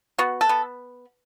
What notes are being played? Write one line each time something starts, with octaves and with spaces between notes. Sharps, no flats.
B3 F#4
A4
B3